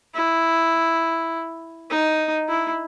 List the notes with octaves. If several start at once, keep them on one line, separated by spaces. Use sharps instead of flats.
E4
D#4
E4